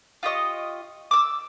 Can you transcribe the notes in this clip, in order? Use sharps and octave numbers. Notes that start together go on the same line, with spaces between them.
F4 G4 D#5 C#6
D6 E6